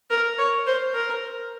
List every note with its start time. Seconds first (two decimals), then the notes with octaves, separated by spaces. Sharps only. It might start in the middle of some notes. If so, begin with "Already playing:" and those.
0.10 A#4
0.38 C#5
0.66 C5
0.94 A#4